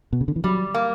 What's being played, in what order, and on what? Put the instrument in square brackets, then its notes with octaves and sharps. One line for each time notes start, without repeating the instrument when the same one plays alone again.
[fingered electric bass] B2
C#3
D3
E3
[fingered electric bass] F#3 [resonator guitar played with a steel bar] G3
[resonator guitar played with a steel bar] A#3